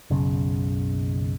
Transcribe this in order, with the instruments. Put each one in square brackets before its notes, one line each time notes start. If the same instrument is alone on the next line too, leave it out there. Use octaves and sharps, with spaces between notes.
[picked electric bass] F#1 B1 C#3